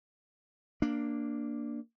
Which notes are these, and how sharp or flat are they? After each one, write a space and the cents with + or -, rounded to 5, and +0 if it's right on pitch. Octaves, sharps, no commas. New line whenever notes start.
A#3 +0 D4 +0